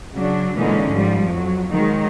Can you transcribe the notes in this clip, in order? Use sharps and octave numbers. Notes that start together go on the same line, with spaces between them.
C#3 F#3 D4
A#2 D3 E3 G#3 C#4 D#4
G#2 F3 G3
F2 F#3
D#3 F#3 G#3